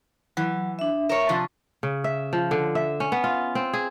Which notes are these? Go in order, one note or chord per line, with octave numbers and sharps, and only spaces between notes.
E3 F#3
D4 E5
A#4 C#5 E5
C3 F3 D4 C#6
C#3
E5
F3
D3
E5
C#4
B3
F4
C4
G#4